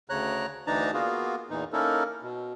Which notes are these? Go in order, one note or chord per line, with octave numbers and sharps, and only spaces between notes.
D2 C#3 C#5 A#5 F#6
D2 E3 D4 D#4 A5 A#5
A#3 B3 F4 F#4 G#4
E2 A#2 E3 D#4
A#3 C#4 D#4 E4 A4 A#4
B2